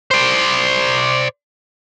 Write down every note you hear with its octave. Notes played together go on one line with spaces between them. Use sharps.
C5 D5